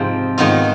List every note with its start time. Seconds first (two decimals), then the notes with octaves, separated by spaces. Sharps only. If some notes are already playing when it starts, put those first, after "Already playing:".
Already playing: G#2 C3 F3 C4
0.38 G#2 D#3 B3 F4